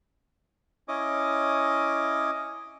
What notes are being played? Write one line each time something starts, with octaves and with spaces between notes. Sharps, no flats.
C#4 E4 C#5 D#5 D6 D#6